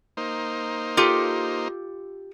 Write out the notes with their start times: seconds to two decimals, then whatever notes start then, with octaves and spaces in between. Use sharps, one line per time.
0.17 A#3 D#4 C5
0.97 F4 G4 A4